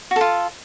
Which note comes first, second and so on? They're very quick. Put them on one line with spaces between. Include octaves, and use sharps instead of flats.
F#4 A4 F4